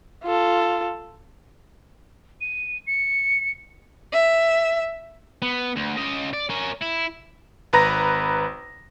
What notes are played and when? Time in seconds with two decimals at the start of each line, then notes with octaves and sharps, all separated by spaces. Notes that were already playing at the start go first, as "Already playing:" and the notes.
0.24 F4 A4
2.41 D#7
2.87 C#7
4.13 E5
5.42 B3
5.76 D2
5.98 C#3 D#5
6.33 D5
6.50 C#4 A#4
6.82 E4
7.73 G#1 B4 A#5 A#6